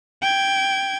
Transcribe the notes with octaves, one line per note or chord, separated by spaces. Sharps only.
G5 G#6